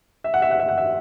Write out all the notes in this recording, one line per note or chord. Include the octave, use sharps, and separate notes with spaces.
E5
F#5
E5
F#5
E5
F#5
E5